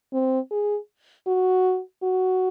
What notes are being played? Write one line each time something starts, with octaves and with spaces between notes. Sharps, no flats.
C4
G#4
F#4
F#4